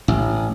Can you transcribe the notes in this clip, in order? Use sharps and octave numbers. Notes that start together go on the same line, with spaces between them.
A1